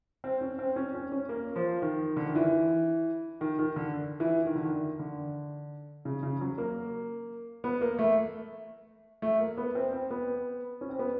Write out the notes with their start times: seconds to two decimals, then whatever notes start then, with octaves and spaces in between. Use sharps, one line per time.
0.24 C4
0.41 C#4
0.59 C4
0.76 C#4
0.94 C#4
1.12 C#4
1.29 A#3
1.56 F3
1.82 D#3
2.17 D3
2.26 D#3
2.35 E3
3.41 D#3
3.59 D#3
3.76 D3
4.20 E3
4.46 D#3
4.56 D3
4.64 D#3
4.99 D3
6.05 C#3
6.23 C#3
6.41 F#3
6.58 A#3
7.64 B3
7.81 A#3
7.99 A3
9.22 A3
9.40 A#3
9.57 B3
9.75 C4
9.93 C4
10.10 B3
10.81 C#4
10.90 C4
10.99 B3